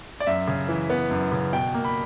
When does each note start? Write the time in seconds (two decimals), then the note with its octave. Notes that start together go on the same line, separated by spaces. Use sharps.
0.20 D5
0.27 F#2 E5
0.47 C#3
0.69 E3
0.90 B3
1.11 F#2
1.32 C#3
1.53 B2 G5
1.74 A#3
1.85 B5